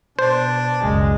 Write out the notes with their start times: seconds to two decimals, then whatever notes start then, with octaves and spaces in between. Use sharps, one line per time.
0.19 B2 D4 C5
0.81 F#1 C#2 G#3